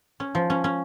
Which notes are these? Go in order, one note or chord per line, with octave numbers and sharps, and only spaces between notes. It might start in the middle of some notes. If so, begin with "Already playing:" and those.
C#4
F3
C#4
C#4